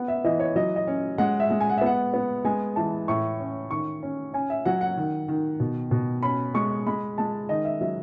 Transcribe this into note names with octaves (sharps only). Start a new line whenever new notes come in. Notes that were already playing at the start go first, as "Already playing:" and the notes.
Already playing: B3 F#5
E5
E3 D#5
C#5
F#3 D#5
D#5
C#4
G#3 F#5
E5
G#3
G#5
F#5
E5
B3 F#5
B3
G#3 G#5
E3 A5
A2 C#6
C#4
D#3 C#6
C#4
C#4 G#5
E5
F#3 F#5
F#5
D#3
D#3
B2
B2
C#4 B5
G#3 C#6
G#3 B5
G#3 A5
D#3 D#5
E5
F#3 E5